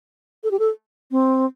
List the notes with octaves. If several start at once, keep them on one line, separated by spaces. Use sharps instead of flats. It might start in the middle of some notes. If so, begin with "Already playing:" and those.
A4
G4
A4
C4